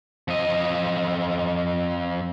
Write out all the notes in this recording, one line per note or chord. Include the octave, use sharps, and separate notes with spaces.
F2 D#5